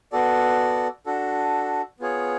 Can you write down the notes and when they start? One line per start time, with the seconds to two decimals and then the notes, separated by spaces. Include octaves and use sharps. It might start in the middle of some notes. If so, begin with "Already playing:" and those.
0.12 B3 F#4 A4 D5
1.06 D4 F#4 A4
2.00 B3 F4 G#4 C#5